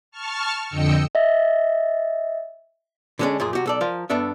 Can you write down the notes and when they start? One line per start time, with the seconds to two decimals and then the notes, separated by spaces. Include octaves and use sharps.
0.11 A5 C#6 F6
0.68 F2 D3 D#5 G5 E6 C#7
1.15 D#5 E5
3.19 D3 G3 G#3 B3 C#4 D4
3.40 F#2 A#2 F3 G#4
3.53 C2 F#4 G4
3.66 B1 A4 D5
3.81 F3 A#4 F5
4.10 G2 B3 D4 A4 E5